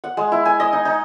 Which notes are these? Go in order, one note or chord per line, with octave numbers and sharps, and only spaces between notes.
F#5
G#3
E4
G#5
D#5
D#4
D#4